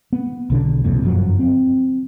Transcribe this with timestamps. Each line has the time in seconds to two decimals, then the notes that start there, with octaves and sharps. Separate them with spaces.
0.13 B3
0.50 B1 D3 D4
0.85 E1 C2 F2 A#2
1.02 G1 F#2 F3 F#3
1.39 C4